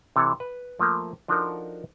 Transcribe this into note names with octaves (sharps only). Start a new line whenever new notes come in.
C3 E3 A4 C#5
B4
F3 A3 A#3
F3 D4 D#4 F#4 A4 A#4